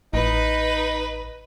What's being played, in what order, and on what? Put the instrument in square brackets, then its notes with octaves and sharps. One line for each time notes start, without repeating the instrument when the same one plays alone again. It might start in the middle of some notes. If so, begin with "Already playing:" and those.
[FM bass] A1 [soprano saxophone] D#4 [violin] B4